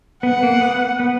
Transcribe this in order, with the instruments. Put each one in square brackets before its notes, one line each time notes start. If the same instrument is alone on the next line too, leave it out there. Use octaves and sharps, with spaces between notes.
[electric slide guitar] B3 [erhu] F#5
[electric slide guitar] A#3
B3
B3